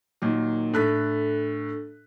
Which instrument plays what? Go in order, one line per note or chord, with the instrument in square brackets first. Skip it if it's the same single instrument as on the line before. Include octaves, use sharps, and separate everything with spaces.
[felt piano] A#2 D#3 F#3
[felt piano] A2 F#6 B6 [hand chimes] D4 A4 A6